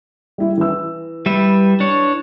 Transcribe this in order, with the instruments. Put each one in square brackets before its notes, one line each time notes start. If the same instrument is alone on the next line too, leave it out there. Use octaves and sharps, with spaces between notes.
[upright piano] G3 E4
E3 E6
[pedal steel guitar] G3 B4 E5
D4 C#5